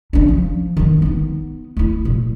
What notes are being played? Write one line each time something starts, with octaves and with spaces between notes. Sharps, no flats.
C#4 D4
F3
G2 D#3
B3 D#4
A3 E4
A#2